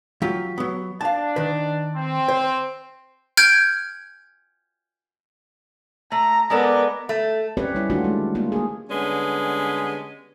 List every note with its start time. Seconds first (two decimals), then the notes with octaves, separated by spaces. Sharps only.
0.22 F#3 F4 G4
0.58 F#3 B3
1.01 D4 F5 A5
1.36 D#3 B4
1.95 C4
2.28 C5
3.37 F6 G6 G#6 D7
6.12 A3 A#5
6.50 G#3 B3 A4 A#4 D5
7.09 A3
7.57 C4 C#4 G4 B4 C#5 D5
7.75 G3 E4
7.90 D#3 A3 D4 F4 F#4
8.04 G#3
8.35 A#3 F4
8.52 A#3 G#4
8.88 D3 G3 G#3 B3 C#4